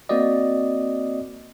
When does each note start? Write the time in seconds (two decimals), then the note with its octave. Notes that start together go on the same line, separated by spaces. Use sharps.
0.09 A#3 C4 F#4 D5 D#5